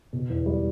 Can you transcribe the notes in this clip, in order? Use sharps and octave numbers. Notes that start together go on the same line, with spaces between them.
B2
E2
G3